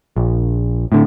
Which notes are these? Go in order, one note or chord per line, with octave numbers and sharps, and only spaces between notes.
A#1
A2 D3